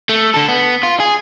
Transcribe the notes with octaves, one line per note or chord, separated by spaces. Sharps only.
A3
D3 A4
B3
F4
G#4